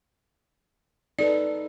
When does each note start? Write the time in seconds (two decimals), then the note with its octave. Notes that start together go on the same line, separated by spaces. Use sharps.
1.19 D#4 A4 B4 D5